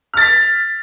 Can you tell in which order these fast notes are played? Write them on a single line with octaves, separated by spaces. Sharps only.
F6 A6 B6